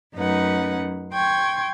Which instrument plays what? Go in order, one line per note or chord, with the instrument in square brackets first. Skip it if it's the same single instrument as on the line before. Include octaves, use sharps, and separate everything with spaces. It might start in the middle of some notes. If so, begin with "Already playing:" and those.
[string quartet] F#2 A3 C#4 D#4 B4 F#5
G5 C6 C#6 G#6